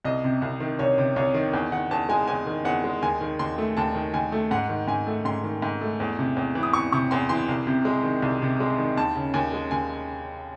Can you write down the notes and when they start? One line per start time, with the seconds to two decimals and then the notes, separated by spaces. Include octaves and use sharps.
0.04 C2 D#5
0.24 C3
0.42 C2
0.60 D#3
0.79 C2 C#5
0.98 C3
1.16 C2 C#5
1.34 D#3
1.53 E2
1.72 D#3 F#5
1.91 E2 A5
2.09 G#3 G#5
2.28 E2 G#5
2.47 D#3
2.65 E2 F#5
2.84 G#3
3.02 D#2 G#5
3.21 D#3
3.39 D#2 C6
3.58 A3
3.77 D#2 A5
3.95 D#3
4.14 D#2 G#5
4.32 A3
4.51 G#2 F#5
4.69 D#3
4.88 G#2 G#5
5.07 A3
5.25 G#2 C6
5.44 D#3
5.62 G#2
5.81 A3
6.00 E2
6.19 C3
6.37 E2
6.55 E3
6.63 D#6
6.73 E2 C#6
6.93 C3 C#6
7.11 E2 C6
7.29 E3 C6
7.48 C2
7.67 C3
7.85 G#3
8.04 D#3
8.22 C2
8.42 C3
8.60 G#3
8.78 D#3
8.97 D#2 A5
9.16 C#3
9.34 D#2 G#5
9.53 G#3
9.71 D#2 G#5